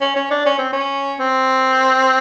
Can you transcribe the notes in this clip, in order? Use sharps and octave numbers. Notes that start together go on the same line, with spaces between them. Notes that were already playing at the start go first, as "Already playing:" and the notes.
C#4
C#4
D4
C#4
C4
C#4
C4